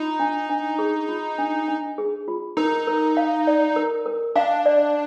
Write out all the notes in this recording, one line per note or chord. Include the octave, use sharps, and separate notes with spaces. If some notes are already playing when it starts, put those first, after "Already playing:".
Already playing: D#4 F4
D4
D4
G#4
F4
D4
D4
G#4
F4
D#4 A#4
A#4
F5
D5
A#4
A#4
D4 F5
D5